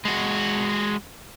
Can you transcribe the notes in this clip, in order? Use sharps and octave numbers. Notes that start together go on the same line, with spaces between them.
G#3 F#4